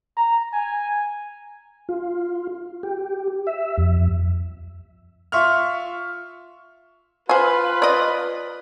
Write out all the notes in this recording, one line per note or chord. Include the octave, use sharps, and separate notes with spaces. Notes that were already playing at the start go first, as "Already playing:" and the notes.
A#5
G#5
F4
G4
E5
F2
F4 E5 C6 C#6 F6
F4 B4 C5 G#5
D5 D#5